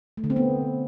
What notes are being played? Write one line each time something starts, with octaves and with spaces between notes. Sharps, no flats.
A3
D3
C4
B3